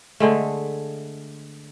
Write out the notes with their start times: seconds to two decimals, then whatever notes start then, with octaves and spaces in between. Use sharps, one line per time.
0.20 D3 G#3 A3